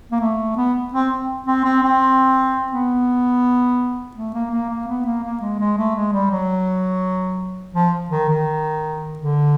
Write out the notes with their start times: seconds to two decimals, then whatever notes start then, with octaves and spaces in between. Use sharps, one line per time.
0.11 A#3
0.21 A3
0.57 B3
0.93 C4
1.46 C4
1.64 C4
1.83 C4
2.72 B3
4.16 A3
4.34 A#3
4.51 A#3
4.70 A#3
4.87 B3
5.05 A#3
5.23 A#3
5.41 G#3
5.60 G#3
5.77 A3
5.95 G#3
6.13 G3
6.31 F#3
7.74 F3
8.10 D#3
8.29 D#3
9.19 D3